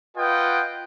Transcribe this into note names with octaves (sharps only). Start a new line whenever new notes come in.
F4 B4 D#5 F#5 G5